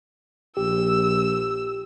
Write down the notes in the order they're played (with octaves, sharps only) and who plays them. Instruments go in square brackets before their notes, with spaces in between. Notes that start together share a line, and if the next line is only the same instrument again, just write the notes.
[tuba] A#1 [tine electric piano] G4 [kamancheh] E6